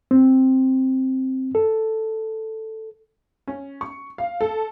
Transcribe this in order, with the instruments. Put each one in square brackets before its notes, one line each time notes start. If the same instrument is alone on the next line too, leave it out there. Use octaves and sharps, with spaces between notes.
[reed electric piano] C4
A4
[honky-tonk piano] C#4
C#6
F5
A4